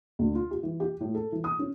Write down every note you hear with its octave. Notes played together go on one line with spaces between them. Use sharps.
D2
F4
G4
E3
G4
A2
A4
E3
D#6
C#4